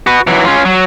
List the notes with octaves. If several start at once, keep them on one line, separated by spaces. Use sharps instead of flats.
F#4 B4
E3 F#3
C#4 F4
F#3